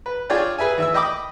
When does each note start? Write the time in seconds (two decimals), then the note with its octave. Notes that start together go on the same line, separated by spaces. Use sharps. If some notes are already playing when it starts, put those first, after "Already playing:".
0.06 B4
0.30 D4 F4 G#4 C#5 D5 G5
0.58 G#4 B4 E5 G#5
0.78 E3 E5 E6
0.94 D#5 G5 B5 D6 D#6